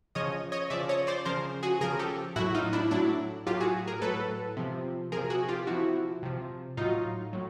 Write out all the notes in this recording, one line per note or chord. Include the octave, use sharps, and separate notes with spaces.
C#3 F3 C#5 D#5
C#5 D#5
C#3 F3 D5 E5
C#5 D#5
C5 D5
C#3 F3 A#4 C5
F#4 G#4
C#3 F3 G#4 A#4
G4 A4
A2 F#3 E4 F#4
D#4 F4
D4 E4
A2 F#3 D4 E4
A2 F#3 F4 G4
F#4 G#4
G#4 A#4
A2 F#3 A4 B4
C3 F3
C3 F3 G#4 A#4
F#4 G#4
F4 G4
C3 F3 E4 F#4
C3 F3
A2 F#3 D#4 F4
A2 F#3